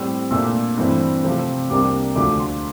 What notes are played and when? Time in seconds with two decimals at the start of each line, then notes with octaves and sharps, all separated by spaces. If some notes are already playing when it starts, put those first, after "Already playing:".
Already playing: A2 G3 C4 E6
0.31 A#2 A3 D4 E6
0.77 G2 E3 A3 C4
1.24 C3 F3 A3 C4
1.70 C2 C3 G3 A#3 D4 D6
2.15 D2 D3 F3 A3 D4 D6
2.39 C6